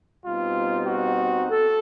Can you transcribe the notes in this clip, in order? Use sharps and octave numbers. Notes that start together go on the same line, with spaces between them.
B2 G3 C4 D#4 F4
F#4
A4